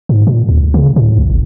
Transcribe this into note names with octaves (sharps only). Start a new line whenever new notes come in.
G#2
A#2
D2
C#3
A2
C2
G1